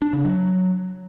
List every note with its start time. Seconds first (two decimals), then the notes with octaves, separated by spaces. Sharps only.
0.02 D4
0.13 C#3
0.25 F#3